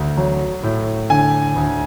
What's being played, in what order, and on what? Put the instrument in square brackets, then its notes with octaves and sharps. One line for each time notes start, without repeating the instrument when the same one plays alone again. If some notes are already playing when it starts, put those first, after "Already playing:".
Already playing: [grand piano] D2
F#3
A2
D3 G#5
D2